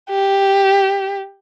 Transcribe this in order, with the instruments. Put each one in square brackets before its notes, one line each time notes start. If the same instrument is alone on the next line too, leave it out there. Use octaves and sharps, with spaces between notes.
[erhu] G4